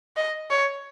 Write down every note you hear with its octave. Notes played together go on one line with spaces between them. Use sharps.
D#5
C#5